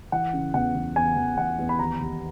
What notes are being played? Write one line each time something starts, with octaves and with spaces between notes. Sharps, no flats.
E3 F#5
C#3
E2 F#5
E2
E2 G#5
E2
E2 F#5
E2
B5
D#2 A#5
D#2